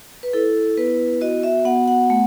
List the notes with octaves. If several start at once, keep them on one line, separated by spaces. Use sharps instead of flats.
B4
E4 A4
B3 B4
F#4 D#5
E5
B3 F#5
F#5
A3